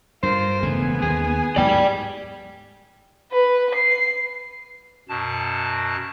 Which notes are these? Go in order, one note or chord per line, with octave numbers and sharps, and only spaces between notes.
G2 F4 A#4 C5
E1 C#3 A3 B3 G#5
D#2 D#3 G#4
D2 G#2 F#3 D5 G5
B4
C7
F#2 B2 A5